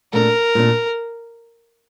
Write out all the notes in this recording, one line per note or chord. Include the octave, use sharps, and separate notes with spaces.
A#2 A3 D4 A#4
A#2 A3 D4